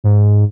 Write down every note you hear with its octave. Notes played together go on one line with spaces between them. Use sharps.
G#2